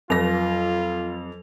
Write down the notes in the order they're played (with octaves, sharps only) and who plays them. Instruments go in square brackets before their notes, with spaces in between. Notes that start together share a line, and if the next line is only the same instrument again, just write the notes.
[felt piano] F2 A#6 [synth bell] F#3 F7 [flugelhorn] F4